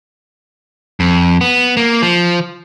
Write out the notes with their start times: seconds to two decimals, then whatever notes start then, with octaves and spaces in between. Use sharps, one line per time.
1.00 F2
1.41 B3
1.77 A#3
2.02 F3